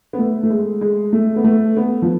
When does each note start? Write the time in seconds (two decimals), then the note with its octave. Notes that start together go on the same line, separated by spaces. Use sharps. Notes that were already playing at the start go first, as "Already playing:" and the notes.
0.13 B3
0.19 A3
0.43 A3
0.50 G#3
0.81 G#3
1.13 A3
1.36 B3
1.44 A3
1.77 B3
2.02 F3